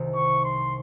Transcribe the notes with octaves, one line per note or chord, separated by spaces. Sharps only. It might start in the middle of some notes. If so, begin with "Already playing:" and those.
Already playing: C2 C3 D#3
C#6
C6